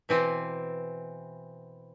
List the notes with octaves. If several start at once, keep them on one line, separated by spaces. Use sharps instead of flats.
B2 E3 C4